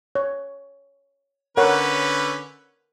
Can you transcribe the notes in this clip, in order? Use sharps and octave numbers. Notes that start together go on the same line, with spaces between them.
C#5
D3 C#4 A#4 B4 C#5 F#5